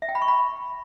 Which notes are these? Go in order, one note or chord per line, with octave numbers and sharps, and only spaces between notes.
E5
G5
B5
C#6
B5